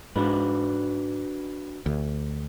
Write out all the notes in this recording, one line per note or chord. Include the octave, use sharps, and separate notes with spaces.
G#2 D4 F#4 B4
D2